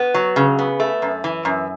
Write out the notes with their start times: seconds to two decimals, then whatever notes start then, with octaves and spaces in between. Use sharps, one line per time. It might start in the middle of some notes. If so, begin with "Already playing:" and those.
Already playing: B3
0.14 F#3
0.36 C#3
0.59 B3
0.80 A3
1.02 F#2
1.24 E3
1.45 F#2